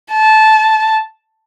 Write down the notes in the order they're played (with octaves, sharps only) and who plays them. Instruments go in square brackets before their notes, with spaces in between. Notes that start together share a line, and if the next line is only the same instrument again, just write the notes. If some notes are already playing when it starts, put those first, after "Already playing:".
[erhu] A5